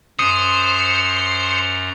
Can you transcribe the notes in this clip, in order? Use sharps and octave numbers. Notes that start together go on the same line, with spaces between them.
F#2 C5 A#5 D#6 C#7